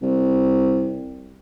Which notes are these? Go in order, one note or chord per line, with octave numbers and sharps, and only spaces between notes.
C2